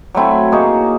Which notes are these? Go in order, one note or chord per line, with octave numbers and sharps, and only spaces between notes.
F#3 A3 C4 E4
A#3 D#4 G#4 C#5